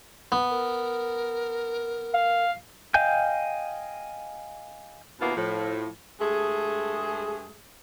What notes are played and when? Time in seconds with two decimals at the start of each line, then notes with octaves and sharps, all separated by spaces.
0.32 B3
0.50 A#4
2.14 F5
2.94 D#5 F5 G5 G#5 G6
5.20 D#2 B2 A#3 B3 E4 F4
5.36 A2 F3
6.20 G2 G#3 A3 G#4